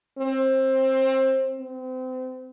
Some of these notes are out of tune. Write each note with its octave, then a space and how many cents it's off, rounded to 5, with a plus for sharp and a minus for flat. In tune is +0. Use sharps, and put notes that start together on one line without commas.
C4 +20
C4 -30